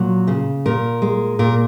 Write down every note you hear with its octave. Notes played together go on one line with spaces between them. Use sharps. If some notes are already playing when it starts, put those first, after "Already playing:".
Already playing: A#2 F#3
C#3
A#2 A#4
G#3
A#2 A#4